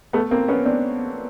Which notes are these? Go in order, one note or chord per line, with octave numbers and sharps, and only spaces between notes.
A3 B3
A#3 C4
B3 C#4
C4 D4